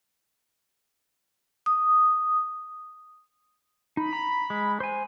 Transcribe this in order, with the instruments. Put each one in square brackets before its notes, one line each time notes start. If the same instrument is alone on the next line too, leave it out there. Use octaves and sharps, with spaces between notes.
[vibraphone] D#6
[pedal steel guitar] D#4 [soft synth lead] B5
[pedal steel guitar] A#5
G#3
C5 G#5